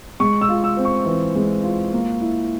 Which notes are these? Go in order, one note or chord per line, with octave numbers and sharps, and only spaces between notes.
G#3 C#6
E6
F4
E6
C4
C#6
E3
G#3
F4
A#3
E4